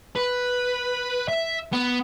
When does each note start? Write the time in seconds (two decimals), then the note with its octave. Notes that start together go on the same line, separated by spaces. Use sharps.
0.15 B4
1.28 E5
1.73 B3